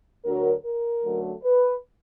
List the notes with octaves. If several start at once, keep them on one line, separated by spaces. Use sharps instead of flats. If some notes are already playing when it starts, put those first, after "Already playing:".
D2 D3 F#3 A#4
A#4
F#2 D3 F#3 A3
B4